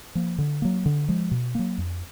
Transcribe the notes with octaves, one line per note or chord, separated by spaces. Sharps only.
F3 A#3
D3
F#3 A#3
D3
F3 G#3
B2
F#3 A#3
F2